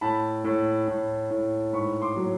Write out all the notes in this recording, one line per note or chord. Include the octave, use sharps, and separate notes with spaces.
A2 A5 B5
A2
A2
A2
G#2 B5 C#6
C6 D6
F#3